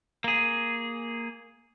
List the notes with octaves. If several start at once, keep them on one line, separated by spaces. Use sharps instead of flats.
A#3 G#4